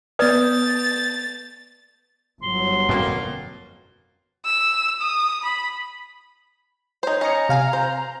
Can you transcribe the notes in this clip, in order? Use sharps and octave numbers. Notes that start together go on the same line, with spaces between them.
B3 B4 D5 D#6 G6 A6
G1 G2 F#3 C6
F2 B2 A#3
E6
D#6
B5
D#4 C5 C#5
C#4 D#5 G#5 A#5 C#7
C3 F5 G#5
C5